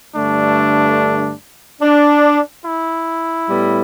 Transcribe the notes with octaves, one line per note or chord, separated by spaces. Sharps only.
G2 D3 A3 D4
D4
E4
A2 G3 B3